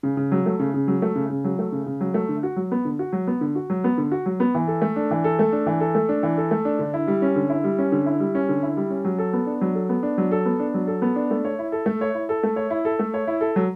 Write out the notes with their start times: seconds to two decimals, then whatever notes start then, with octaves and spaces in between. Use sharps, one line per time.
0.03 C#3
0.17 C#3
0.32 F#3
0.46 A3
0.59 C#3
0.74 C#3
0.88 F#3
1.02 A3
1.15 C#3
1.30 C#3
1.44 F#3
1.59 A3
1.72 C#3
1.86 C#3
2.01 F#3
2.14 A3
2.29 D3
2.43 F#4
2.56 F#3
2.72 B3
2.85 D3
2.99 F#4
3.13 F#3
3.27 B3
3.41 D3
3.55 F#4
3.70 F#3
3.84 B3
3.98 D3
4.12 F#4
4.26 F#3
4.40 B3
4.55 E3
4.68 A4
4.82 A3
4.96 D4
5.11 E3
5.24 A4
5.39 A3
5.53 D4
5.67 E3
5.80 A4
5.95 A3
6.09 D4
6.23 E3
6.37 A4
6.51 A3
6.65 D4
6.79 D3
6.94 E4
7.08 G3
7.22 C#4
7.36 D3
7.49 E4
7.64 G3
7.78 C#4
7.92 D3
8.06 E4
8.20 G3
8.35 C#4
8.49 D3
8.63 E4
8.77 G3
8.90 C#4
9.05 F#3
9.19 A4
9.33 B3
9.46 D4
9.61 F#3
9.75 A4
9.89 B3
10.03 D4
10.18 F#3
10.31 A4
10.46 B3
10.60 D4
10.74 F#3
10.87 A4
11.02 B3
11.16 D4
11.31 A3
11.45 C#5
11.59 E4
11.72 A4
11.86 A3
12.01 C#5
12.14 E4
12.29 A4
12.43 A3
12.56 C#5
12.70 E4
12.85 A4
12.99 A3
13.14 C#5
13.27 E4
13.41 A4
13.56 F#3